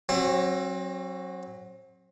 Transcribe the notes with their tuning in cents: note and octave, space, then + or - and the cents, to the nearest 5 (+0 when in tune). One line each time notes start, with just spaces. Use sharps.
F#3 +0 C4 +35